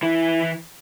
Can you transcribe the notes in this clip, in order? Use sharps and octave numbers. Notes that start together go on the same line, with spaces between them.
E3 E4